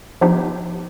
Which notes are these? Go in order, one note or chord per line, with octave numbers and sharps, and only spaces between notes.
F3 B3 D4 D#4 G4